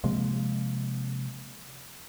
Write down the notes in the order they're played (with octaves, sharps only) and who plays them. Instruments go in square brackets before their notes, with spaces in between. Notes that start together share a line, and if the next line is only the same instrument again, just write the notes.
[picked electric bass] C3 F3 G#3 A#3